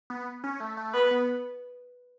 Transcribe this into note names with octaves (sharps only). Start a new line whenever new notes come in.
B3
C#4
A3
A3
B3 B4
B3